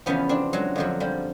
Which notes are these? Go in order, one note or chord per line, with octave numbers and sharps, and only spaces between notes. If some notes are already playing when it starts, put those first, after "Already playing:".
E2 C#3 F3 B3 C#4
C4 D4
F#3 G#3
F2 D3 F3 F#3
F3 G3